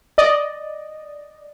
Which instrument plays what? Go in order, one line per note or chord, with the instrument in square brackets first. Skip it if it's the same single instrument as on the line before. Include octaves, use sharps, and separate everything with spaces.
[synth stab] D5 D#5